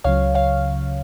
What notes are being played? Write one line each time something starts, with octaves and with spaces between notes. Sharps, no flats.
C#2 C#3 F#3 C#5 F5
C#5 F5